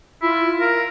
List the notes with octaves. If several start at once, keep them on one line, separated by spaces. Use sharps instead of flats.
E4 F4
A#4 F5